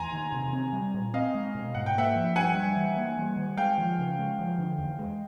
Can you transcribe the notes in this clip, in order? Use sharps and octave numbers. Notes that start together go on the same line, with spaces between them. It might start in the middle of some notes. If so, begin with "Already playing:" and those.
Already playing: E2 G#5 A#5 C6
D#3
C3
C4
G3
A#2
C4 D#5 F5
G#3
B2
G#2 F#5
G5
A#3 E5 F#5
F3
G2 F#5 G#5
G3
E3
A#3
G3
D#3
G#3 F5 G5
F3
C#3
G#3
F3
D3
E2
G#3